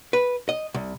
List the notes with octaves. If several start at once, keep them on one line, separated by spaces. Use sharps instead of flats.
B4
D#5
C2